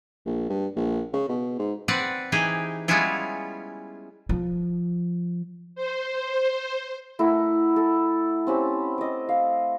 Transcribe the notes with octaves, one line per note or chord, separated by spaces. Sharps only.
A#1
G2
A#1
C#3
B2
G#2
C4 B4 D5 F#5
E3 D#4 G4 G#4
G3 G#3 B3 C#4 E4 F4
F3
C5
A3 E4 A#4 F#5
A4
C4 C#4 G4
D#5 D6
F5